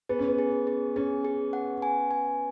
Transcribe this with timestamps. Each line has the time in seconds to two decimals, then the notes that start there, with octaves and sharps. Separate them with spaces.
0.09 B3 G#4
0.19 C#4
0.28 B3
0.39 G#4
0.67 G#4
0.96 C#4 G#4
1.25 G#4
1.53 F#5
1.82 G#5
2.11 G#5